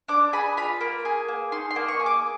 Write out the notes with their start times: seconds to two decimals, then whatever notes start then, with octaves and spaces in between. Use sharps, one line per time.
0.08 D4 D6
0.33 G#4 B5
0.57 F4 B5
0.81 A#3
1.05 G#4
1.28 A#3
1.52 D#4 C6
1.71 C6
1.76 A#3
1.88 C#6
2.00 G#4
2.06 D6